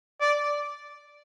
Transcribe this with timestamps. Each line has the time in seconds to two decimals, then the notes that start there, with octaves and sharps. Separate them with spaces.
0.20 D5